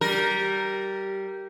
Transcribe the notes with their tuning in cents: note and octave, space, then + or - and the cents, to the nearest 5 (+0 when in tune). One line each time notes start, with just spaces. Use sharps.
G3 -15 A#4 +0